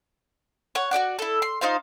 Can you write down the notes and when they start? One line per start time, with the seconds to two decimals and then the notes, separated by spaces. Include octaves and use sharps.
0.75 C#5 F#5
0.91 F#4 G4 D5 F#5
1.19 E4 A4
1.42 C6
1.61 D#4 F4 C5 F5